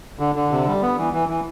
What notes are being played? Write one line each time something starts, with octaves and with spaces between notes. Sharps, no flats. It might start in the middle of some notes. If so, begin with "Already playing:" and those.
D3
D3
C3
G3
B3
E3
E3
E3